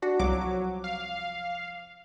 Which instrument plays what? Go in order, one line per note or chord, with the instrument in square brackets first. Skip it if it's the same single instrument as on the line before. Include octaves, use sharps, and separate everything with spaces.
[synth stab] D4 F#4
[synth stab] C2 F3 D6 [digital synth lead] F#3
[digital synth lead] F5